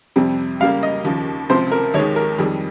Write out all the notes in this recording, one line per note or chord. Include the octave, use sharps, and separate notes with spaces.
F2 C3 G3 C4
C#2 C#3 G3 A#3 F5
D#5
D#2 C#3 F3
C#2 C3 F3 C4 C5
A#4
D#2 D#3 G#3 C#5
A#4
F2 D#3 G3 G#4